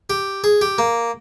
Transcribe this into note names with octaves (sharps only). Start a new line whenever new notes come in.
G4
G#4
G4
A#3